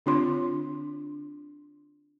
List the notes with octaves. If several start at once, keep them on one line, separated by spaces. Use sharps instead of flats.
D3 C4 D4 F4 C#5 C6